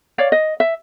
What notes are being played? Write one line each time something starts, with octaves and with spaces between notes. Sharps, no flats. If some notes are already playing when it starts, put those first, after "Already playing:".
C#5 D5 F5
D#5
E5